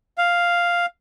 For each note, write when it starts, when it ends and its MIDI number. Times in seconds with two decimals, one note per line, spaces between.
0.18 0.86 77